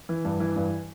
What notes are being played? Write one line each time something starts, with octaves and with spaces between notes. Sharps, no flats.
E3
G2
E3
G2